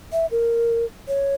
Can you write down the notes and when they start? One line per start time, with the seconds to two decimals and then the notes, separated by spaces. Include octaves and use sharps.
0.13 E5
0.31 A#4
1.08 C#5